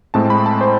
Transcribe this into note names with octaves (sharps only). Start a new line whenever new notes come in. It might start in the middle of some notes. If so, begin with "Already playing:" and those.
A2 G#3 C4 A5
B5
A5
C5